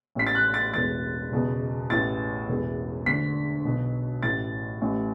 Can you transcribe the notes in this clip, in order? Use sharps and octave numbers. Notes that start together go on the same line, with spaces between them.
A1 A2 E3 B6
A6
F#6
A6
E1 E2 E3 A6
F#1 E2 B2
A1 A2 E3 A6
E1 E2 E3
D2 D3 B6
B1 B2
A1 A2 E3 A6
A1 A2 E3